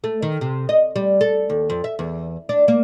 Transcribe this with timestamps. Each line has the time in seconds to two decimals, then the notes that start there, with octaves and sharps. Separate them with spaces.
0.04 A3
0.22 D#3
0.41 C3
0.69 D#5
0.96 G3
1.21 A4
1.50 D#2
1.70 F2
1.84 E5
1.99 E2
2.49 D4
2.68 A#3